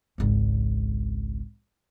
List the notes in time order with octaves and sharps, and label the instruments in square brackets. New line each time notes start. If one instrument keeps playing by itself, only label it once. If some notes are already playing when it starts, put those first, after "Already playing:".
[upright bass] G#1 C#2